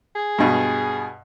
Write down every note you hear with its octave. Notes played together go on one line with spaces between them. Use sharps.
G#4
G2 B2